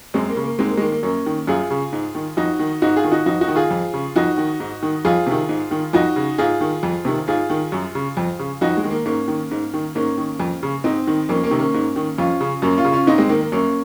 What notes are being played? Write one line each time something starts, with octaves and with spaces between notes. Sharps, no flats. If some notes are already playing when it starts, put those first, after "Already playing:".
F#2 G#3 C4
A#3
C#3
A#3
G#2 G#3 C4
A#3
G#3
D#3 A#3
A#3
F#2 A#3 C#4
D#3
F#2 F4 G#4
C#3
G#2
D#3
F2 D#4 F#4
D#3
G#2 D#4 F#4
F4 G#4
D#3
D#4 F#4
F2 D#4 F#4
D#4 F#4
D#3
F4 G#4
F2
C#3
F2 D#4 F#4
D#3
G#2
D#3
F2 F4 G#4
C3 D#3
G#2
D#3
F2 D#4 F#4
C#3
G#2 F4 G#4
D#3
F2
C3 D#3
G#2 F4 G#4
D#3
F#2
C#3
F2
C#3
F2 D#4 F#4
G#3
D#3
A#3
G#2 A#3 C#4
D#3
G#2
D#3
G#2 A#3 C#4
D#3
F2
C#3
G#2 C4 D#4
D#3
F2 A#3 C#4
A#3 C#4
C3 D#3
A#3 C#4
G#2
D#3
F2 C#4 F4
C#3
F#2 A#3 C#4
C#4 F4
C#3
C#4 F4
G#2 C4 D#4
G#3 C4
D#3 A#3
A#3
F#2 A#3 C#4